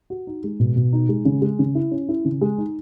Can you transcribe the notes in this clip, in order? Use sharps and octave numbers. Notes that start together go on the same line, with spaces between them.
F#4
D#4
G#3
B2
B2
D#4
G#3
C#3
G#3
C#3
E4
C#4
E4
C#3
G#3
D#4